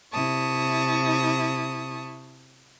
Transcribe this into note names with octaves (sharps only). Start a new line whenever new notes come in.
C3 E4 A5 C#6 D#6